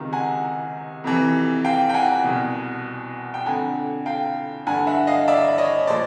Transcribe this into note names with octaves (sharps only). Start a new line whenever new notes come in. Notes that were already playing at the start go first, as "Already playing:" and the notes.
Already playing: C#2 C3 D#3
F#5 G#5
F2 C3 E3
F5 G5
G5
F#5 G#5
C2 B2
G5
F2 D3 F#5 G#5
F5 G5
G2 D3 F#5 G#5
E5 F#5
D#5 F5
D5 E5
C#5 D#5
A#2 C5 D5